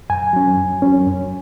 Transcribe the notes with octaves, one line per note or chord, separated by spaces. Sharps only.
F#2 G#5
F#3 C#4
F#2
F#3 C#4
F#2